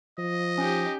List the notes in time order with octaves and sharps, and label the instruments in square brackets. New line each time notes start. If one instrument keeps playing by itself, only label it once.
[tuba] F3 [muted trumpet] D#5
[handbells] C#4 [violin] D#4 G4